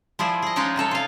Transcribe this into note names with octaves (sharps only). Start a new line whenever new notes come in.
F3 E4 G#4 D5
G#4 D#5
G#3 C#4 D#4 F4 C#5 D5
C3 D#4 A4 C#5
F4 F5